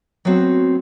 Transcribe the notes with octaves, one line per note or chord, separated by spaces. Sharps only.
F#3 A3 B3 C4 F#4